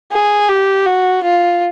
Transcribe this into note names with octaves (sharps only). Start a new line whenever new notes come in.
G#4
G4
F#4
F4